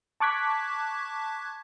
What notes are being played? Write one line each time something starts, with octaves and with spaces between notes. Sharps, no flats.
A5 C#6 D6 F#6 G#6 B6